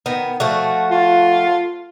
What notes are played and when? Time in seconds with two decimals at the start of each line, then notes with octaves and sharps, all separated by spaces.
0.06 D#3 B3
0.40 F3 A3 F#4
0.91 F4